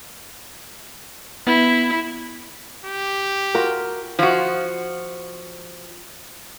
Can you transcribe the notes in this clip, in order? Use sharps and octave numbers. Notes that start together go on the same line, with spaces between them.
B3 E4
G4
F4 F#4 A#4
F3 F#4